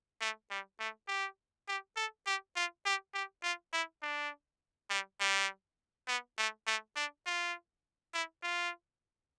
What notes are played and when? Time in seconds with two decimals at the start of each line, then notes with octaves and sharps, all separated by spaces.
0.21 A3
0.50 G3
0.80 A3
1.08 G4
1.68 G4
1.97 A4
2.26 G4
2.56 F4
2.86 G4
3.14 G4
3.43 F4
3.73 E4
4.02 D4
4.90 G3
5.20 G3
6.08 B3
6.38 A3
6.67 A3
6.96 D4
7.26 F4
8.14 E4
8.43 F4